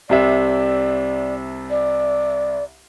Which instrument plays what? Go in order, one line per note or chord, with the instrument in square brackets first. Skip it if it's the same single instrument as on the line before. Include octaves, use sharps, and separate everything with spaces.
[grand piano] C2 C3 E5 [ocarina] D5
[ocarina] D5